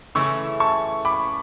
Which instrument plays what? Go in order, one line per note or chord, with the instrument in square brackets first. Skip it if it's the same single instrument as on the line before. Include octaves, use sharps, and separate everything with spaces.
[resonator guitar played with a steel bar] C#3 E3 A3 C#4 E4 [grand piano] C#6 E6
[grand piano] A5 C#6
B5 D6